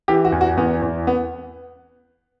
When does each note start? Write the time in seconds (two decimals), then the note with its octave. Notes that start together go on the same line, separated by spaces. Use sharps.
0.08 E3 G4
0.25 F#4
0.32 E2
0.41 F#4
0.57 E2 B3
0.82 E2
1.07 B3